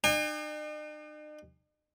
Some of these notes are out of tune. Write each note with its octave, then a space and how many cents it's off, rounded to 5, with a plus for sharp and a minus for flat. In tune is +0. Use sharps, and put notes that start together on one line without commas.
D#4 -45 G#5 -45